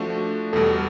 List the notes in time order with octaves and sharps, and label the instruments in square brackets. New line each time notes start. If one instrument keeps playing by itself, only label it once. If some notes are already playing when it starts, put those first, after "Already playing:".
Already playing: [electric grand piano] F3 A3 D4 F#4
[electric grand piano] E2 B2 G3 [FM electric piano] A4